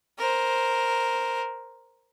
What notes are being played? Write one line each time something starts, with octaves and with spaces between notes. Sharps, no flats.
A#4 C5